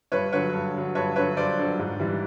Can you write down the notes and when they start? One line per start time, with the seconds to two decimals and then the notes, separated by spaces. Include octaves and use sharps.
0.12 G2 B4 C#5
0.32 D3 F#3 B4 C#5
0.53 G2
0.74 D3 F#3
0.95 G2 B4 C#5
1.16 D3 F#3 B4 C#5
1.37 G2 C5 D5
1.58 D3 F#3
1.79 G#2
2.00 E3 G3